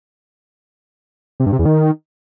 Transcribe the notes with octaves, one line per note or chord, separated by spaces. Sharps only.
C3
G2
C3
E2
D#3